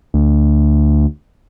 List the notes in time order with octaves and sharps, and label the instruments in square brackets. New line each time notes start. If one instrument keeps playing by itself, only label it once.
[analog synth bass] D2